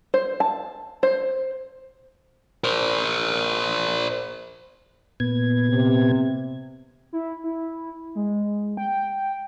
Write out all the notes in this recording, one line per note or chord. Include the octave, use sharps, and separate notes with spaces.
C5
A5
C5
A#4 C5
A#2 B3 G#6
C3
E4
E4
G#3
G5